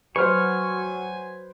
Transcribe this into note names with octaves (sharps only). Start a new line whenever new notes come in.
F#3 B4 C5 G#5 C#6 F6